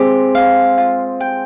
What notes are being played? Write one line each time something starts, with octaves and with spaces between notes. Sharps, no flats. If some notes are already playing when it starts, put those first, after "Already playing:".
Already playing: G#3 C4 G4
F5
F4
G5